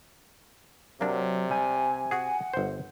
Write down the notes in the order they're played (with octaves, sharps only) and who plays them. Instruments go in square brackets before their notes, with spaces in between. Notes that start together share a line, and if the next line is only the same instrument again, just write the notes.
[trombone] C3 [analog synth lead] F#3 [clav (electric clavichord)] A#3 D4 [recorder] D5
[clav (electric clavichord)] G3 [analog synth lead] G#5
[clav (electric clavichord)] F#4 G#4 [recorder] F#5
[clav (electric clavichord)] G1 C5